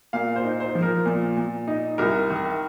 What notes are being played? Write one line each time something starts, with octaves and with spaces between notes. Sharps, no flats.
A#2 F5
C5
D#4
C5
F3
A#4
A#2
A#2
D#4
C2 A#4
D#3